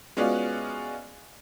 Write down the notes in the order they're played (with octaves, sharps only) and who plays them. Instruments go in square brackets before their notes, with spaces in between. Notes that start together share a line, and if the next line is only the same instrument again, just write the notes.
[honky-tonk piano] G#3 B3 C#4 F4 F#4 D5